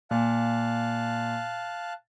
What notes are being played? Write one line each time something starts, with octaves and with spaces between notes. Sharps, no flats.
A#2 F5 A5 F#6